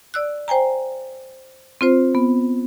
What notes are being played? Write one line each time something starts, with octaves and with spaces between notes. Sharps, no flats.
D5 E6 F#6
C5 G5 G#5 A#5
C4 F4 C5
B3